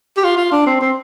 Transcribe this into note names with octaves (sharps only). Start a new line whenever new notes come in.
G4
F4
F4
D4
C4
C4